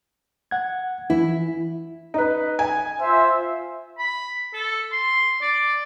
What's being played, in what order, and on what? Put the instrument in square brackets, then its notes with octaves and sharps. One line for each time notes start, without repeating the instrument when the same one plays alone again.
[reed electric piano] F#5 G#6
[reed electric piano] E3 [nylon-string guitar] E4
[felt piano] D#4 B4
G#5
[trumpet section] F4 C5 E5
[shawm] B5
A4
C6
D5